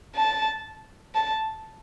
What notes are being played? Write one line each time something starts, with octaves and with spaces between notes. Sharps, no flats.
A5
A5